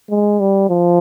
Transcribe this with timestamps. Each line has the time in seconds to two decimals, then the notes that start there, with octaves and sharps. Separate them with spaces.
0.10 G#3
0.40 G3
0.70 F3